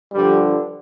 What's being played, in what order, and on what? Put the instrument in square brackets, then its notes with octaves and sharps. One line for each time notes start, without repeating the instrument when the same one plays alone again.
[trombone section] G2 D3 F3 G3